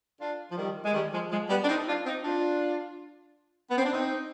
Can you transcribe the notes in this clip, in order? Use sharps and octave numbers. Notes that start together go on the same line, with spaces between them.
D4 F4
F3
D#3 G3
G#3
D#3 G3
F3 G#3
F3 G#3
G3 B3
D4
C4 D#4
D4 F4
C4 D#4
D4 F4
B3
C4
D4
C4 D#4